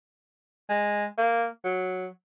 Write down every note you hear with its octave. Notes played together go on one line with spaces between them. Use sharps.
G#3
A#3
F#3